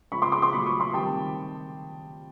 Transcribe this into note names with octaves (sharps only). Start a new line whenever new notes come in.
C#3 F3 G#3 B5 C#6
C6 D6
C6 D6
C6 D6
A#2 F#3 A3 B5 C#6
C#6 D#6
C6 D6
C3 D#3 G3 G5 A5